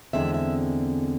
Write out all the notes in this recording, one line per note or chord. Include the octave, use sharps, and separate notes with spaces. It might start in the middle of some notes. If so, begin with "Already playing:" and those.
E2 D3 G#3 C4 E5
E5